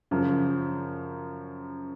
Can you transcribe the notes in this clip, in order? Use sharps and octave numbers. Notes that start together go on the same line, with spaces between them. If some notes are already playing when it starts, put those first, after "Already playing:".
F#2 C#3 F3